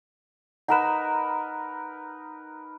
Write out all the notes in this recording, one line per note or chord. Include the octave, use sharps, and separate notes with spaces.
D#4 A#4 B4 F#5 A#5 E7